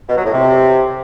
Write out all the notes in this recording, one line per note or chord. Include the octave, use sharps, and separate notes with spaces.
B2
F#3
A2
C3